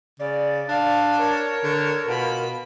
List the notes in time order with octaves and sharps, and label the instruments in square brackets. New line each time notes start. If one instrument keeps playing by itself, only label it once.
[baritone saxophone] C#3 [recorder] D5
[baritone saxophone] D4 [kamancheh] F5
[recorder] A#4 [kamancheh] C#5
[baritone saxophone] D3
[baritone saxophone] B2 [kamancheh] F4 B5